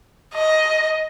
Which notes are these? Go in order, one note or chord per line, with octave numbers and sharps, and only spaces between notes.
D#5